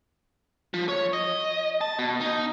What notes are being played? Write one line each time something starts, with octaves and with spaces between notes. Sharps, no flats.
F3
C#5
D#5
A5
B2
D#4